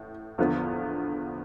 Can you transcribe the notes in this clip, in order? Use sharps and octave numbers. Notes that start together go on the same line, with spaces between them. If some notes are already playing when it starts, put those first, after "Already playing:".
Already playing: A1 A2
E2 D3 F3 B3